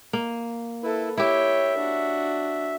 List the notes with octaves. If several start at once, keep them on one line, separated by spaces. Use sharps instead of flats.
A#3
E4 A4 B4
E4 G4 C#5 E5 G5
D4 F#4